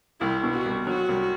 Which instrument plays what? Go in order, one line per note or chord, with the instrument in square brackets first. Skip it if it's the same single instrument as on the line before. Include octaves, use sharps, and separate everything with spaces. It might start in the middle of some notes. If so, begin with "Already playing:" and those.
[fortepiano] C2 [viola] E4
[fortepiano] B2
[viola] F#4
[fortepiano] C2
[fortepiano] F#3 [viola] F#4
[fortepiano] C2